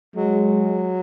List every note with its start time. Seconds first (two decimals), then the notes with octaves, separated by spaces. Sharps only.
0.16 F#3 G#3